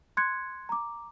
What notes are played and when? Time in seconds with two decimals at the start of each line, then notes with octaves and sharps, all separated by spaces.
0.17 C6 F#6 G#6 C#7
0.69 A#5 D6